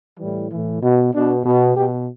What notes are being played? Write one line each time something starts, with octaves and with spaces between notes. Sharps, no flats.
A2 E3 G3
A2 E3
B2
B2 D4
B2
B2 G4